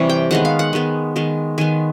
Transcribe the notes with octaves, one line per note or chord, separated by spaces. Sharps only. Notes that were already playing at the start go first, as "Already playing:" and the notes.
Already playing: C3 E3 G3 E4 C#5
G5
D#3 G#3 B3 F#5
F5
F#5
D#3 G#3 B3
D#3 G#3 B3
D#3 G#3 B3 G#5